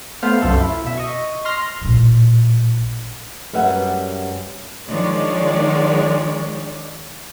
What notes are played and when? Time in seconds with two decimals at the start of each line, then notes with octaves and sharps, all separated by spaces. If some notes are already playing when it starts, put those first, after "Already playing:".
0.22 A3 B3 C5 F5
0.42 C2 F#2 F4 A4
0.60 E4
0.85 B2 E5
0.97 D#5 C#6
1.45 C6 F6 A#6
1.81 A1 A#2
3.53 F#2 G3 B4 E5 F#5
4.88 D#3 F3 G#3 D4 C#5 D5